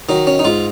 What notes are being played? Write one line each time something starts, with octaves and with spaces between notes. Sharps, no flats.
D#3 F#3 D#4
C#4
D#4
G#2 F4